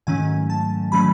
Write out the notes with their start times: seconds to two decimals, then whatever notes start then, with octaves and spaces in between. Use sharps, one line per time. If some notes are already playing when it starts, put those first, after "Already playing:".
0.07 G#2 D#3 F#3 A3 C#4 G#5
0.50 A5
0.92 D#3 F#3 A3 C#4 B5